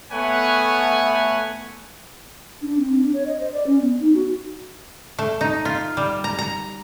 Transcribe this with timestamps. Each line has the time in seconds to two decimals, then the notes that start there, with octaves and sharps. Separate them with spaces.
0.11 A3 B3 B4 C#5 F#5 G#5
2.62 D4
2.79 C4
2.97 D4
3.14 C#5
3.26 D#5
3.40 C5
3.53 D5
3.66 C#4
3.81 B3
4.00 D#4
4.14 F#4
5.19 A3
5.41 D#4
5.65 F4
5.97 G3
6.24 A#5
6.39 A#5